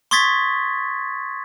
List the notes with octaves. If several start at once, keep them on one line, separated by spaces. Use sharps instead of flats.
C6 C#6 D#6 G#6 A6 B6